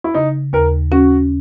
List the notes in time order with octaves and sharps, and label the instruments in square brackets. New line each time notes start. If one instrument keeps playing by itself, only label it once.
[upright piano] E4
[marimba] C#3 [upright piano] D#4
[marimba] D#2 [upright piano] A#4
[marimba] C#4 [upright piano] F#4